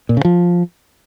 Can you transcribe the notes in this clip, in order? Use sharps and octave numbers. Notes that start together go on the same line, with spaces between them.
A#2
C#3
F3